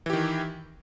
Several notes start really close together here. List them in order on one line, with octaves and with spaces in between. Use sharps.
E3 G4 D#3